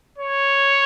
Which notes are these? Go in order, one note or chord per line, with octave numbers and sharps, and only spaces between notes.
C#5